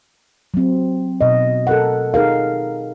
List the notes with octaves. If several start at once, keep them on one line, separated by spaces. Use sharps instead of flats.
F#3 C4
B2 D#5
A4 A#4 F#5
D#4 G#4 A#4 F5